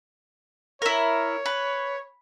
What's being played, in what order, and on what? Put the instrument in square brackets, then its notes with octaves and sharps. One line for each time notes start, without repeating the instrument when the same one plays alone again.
[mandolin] E4 A#4 [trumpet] C#5
[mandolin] B4